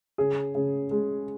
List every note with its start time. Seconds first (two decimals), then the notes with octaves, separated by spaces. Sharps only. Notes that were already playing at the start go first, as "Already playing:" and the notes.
0.18 C#3 G#4
0.55 C#3
0.91 G#3